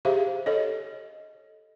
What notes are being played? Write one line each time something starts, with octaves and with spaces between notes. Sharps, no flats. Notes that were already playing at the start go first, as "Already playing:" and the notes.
G4 G#4 C5 E5 F5
A4 C#5 D#5